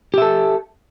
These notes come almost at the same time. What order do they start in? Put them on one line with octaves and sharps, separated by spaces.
G4 E5 A4